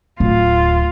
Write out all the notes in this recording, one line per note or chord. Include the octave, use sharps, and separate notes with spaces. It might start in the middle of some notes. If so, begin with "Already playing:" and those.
D1 F4